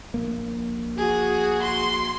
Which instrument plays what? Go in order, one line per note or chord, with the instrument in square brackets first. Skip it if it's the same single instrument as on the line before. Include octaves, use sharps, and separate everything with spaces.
[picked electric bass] A#1 A#3
[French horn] F#4 [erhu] G#4
[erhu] C6